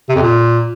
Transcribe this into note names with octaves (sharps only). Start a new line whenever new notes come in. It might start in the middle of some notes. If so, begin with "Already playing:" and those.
C3
F2
A#2